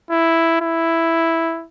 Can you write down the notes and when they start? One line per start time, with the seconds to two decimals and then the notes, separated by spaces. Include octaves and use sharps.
0.10 E4
0.61 E4